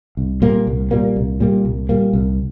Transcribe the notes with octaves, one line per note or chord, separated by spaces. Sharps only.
C2
A#2 G3 A#3
C2
A#2 G3 A#3
C2
A#2 G3 A#3
C2
A#2 G3 A#3
C2